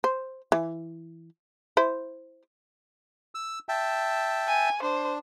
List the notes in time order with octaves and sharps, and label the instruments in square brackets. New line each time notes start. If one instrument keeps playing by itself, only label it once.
[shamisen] C5
E3
E4 C5
[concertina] E6
E5 G5 A5
[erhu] G#5
[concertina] D4 [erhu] C5